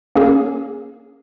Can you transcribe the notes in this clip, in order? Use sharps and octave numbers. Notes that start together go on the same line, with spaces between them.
A#3 C#4 G#4